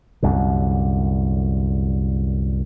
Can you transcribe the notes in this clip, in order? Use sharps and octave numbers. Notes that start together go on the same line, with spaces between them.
C2 F#2 D3